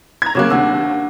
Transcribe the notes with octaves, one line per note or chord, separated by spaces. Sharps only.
A#5 G#6
C#3 F#3 A#3 C#6 D6 F#6
D#2 C3 D4 F#5 E6